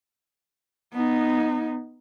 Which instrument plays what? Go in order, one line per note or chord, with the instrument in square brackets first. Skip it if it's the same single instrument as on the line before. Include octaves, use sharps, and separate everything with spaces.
[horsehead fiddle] B3 D#4